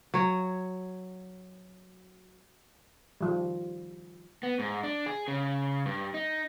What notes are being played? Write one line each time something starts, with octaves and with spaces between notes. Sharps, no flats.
F#3 C#5
D#3 F3 G3
B3
G#2
D4
G#4
C#3
G2
D#4